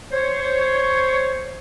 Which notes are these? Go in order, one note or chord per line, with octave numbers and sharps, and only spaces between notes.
C5 C#5